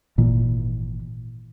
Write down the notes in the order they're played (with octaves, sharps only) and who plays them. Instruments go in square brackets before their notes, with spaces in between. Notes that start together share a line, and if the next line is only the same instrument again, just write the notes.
[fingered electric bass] G#1 A#2 E3